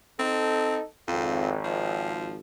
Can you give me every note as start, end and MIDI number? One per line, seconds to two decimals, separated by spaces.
0.19 0.77 60
0.19 0.82 63
0.19 0.82 69
1.08 2.40 32
1.08 1.54 41
1.64 2.36 53